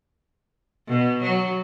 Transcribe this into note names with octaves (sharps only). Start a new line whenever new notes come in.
B2
F#3